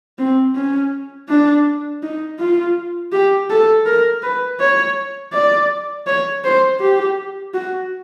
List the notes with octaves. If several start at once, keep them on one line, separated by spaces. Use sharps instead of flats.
C4
C#4
D4
D#4
F4
G4
A4
A#4
B4
C#5
D5
C#5
C5
G4
F#4